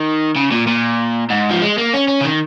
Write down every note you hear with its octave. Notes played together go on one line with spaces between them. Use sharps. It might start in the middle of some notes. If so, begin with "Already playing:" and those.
Already playing: D#3
C#3
A#2
A#2
G#2
F3
G#3
A#3
C#4
C#4
C#3
D#3